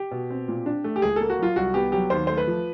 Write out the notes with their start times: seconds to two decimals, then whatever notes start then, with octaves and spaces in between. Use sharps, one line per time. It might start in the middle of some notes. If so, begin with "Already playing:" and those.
Already playing: G4
0.11 B2
0.30 C4
0.48 A#2
0.66 D4
0.84 A3
0.96 G4
1.02 C#2 G#4
1.16 A#3 A4
1.30 F#4
1.39 F#3 F4
1.56 C2 F#4
1.74 B3 G4
1.92 F#3 G4
2.10 D#2 C5
2.27 A3 C5
2.37 B4
2.47 F3